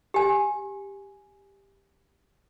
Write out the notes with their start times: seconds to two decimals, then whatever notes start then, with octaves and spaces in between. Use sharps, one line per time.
0.14 G4 G#5